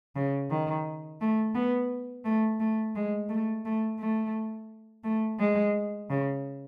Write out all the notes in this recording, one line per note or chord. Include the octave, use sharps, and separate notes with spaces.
C#3
D#3
A3
B3
A3
A3
G#3
A3
A3
A3
A3
G#3
C#3